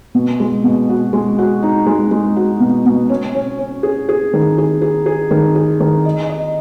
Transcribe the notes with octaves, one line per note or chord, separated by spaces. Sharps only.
B2
G#3
B2
F#4
G#3
F#4
D#4
G#3
G#3
F#4
B2
B2
C#4
C#4
C#4
G#4
G#4
D#3
G#4
G#4
G#4
D#3
G#4
D#3
D#5
D#5